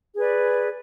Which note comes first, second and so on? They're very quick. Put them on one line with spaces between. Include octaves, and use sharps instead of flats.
G#4 B4 D5